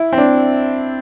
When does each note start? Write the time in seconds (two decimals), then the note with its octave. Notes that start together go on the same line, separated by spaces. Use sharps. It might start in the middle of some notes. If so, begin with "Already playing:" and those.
Already playing: E4
0.12 C4
0.18 D4